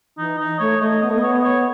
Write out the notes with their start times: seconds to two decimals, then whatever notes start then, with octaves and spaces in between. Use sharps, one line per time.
0.18 E3 D#4
0.39 D#4
0.60 A3 C#5
0.81 A3 D#5
1.02 B3 D#5
1.10 A3
1.18 B3 C#5
1.33 D#5
1.44 C#5